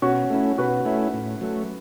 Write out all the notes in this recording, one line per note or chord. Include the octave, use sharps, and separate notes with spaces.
B2 C#4 F#4
A3 C#4 E4
B2 F#4 B4
A3 C#4 E4
A2
F#3 A3